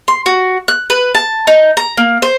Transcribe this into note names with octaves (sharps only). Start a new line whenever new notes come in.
C6
F#4
F#6
B4
A5
D#4
A#5
A#3
C5